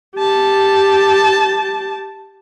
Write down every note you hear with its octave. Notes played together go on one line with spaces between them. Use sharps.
G4 A5